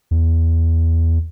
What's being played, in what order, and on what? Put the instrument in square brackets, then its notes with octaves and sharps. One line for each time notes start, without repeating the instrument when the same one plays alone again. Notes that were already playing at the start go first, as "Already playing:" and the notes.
[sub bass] E2